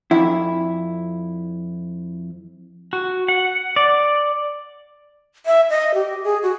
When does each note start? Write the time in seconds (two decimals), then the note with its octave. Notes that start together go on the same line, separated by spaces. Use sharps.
0.11 F2 E4
2.93 F#4
3.28 F#5
3.76 D5
5.46 E5
5.70 D#5
5.94 G4
6.24 G#4
6.43 F#4